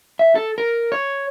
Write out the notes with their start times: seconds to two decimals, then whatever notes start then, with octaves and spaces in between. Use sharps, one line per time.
0.19 E5
0.35 A4
0.58 A#4
0.92 C#5